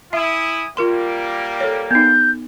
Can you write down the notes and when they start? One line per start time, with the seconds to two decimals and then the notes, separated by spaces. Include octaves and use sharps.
0.13 E4 E5 G#5 D#6
0.77 G3 A#3 F4 A#4 C6
1.61 A4 C#5
1.91 B3 D#4 G6